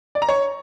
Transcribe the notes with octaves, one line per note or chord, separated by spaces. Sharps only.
D5
A#5
C#5